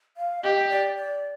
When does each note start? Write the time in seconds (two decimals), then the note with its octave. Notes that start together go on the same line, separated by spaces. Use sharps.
0.17 F5
0.43 G4 D#5
0.69 D5
0.96 D5